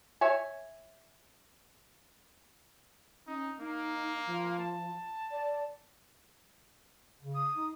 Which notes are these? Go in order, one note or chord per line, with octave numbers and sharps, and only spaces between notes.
C#5 E5 G#5
C#4 D#4
A#3 D#4
F3
A5
D5
C#3
D#6
D#4